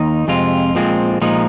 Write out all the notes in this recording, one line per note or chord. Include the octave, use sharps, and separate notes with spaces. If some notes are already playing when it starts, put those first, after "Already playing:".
Already playing: D#2 D#3 D#4
F2 C3 G#3 C4 F4
A#2 F3 G#3 C4
A#2 F3 G#3 D#4